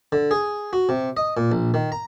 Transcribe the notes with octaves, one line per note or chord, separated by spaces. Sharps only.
D3
G#4
F#4
C3
D#5
A#2
A#1
D#3
A#5